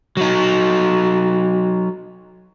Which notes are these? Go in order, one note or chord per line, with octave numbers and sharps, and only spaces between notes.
F#3 D#4